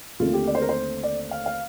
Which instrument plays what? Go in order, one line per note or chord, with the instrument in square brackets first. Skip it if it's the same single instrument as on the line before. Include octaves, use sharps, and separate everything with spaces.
[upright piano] D#2 D3 A3 C4 F4
G4
D5
C5
A#4
C5
D5
F5
F5